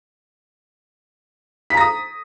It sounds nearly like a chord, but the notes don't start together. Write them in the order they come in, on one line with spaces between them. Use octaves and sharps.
B6 A#5 A#6 D#6